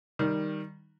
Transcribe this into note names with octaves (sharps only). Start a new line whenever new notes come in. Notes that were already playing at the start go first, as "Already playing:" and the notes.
D#3 G3